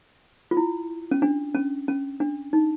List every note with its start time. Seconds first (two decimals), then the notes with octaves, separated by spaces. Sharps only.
0.51 F4
0.57 E4
1.11 C#4
1.22 D4
1.55 C#4
1.88 C#4
2.20 D4
2.53 D#4